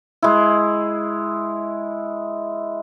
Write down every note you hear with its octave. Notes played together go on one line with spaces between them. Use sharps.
G#3 E4